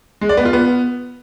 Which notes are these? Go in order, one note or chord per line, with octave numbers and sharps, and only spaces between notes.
G#3
D5
B3
F4
B3